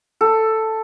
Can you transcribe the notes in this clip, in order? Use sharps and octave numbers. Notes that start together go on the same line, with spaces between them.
A4